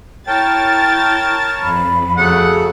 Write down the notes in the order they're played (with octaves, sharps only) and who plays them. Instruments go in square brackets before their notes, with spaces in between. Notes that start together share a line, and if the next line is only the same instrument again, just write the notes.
[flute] E4 [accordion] A#4 C#5 A5 [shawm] G5 [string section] A6
[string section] F2 [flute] B5
[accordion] C#3 F#3 A3 [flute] G#4 [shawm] F#5